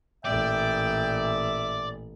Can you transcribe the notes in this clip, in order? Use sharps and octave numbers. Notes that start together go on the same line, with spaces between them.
A1 A#2 D5 E5 G5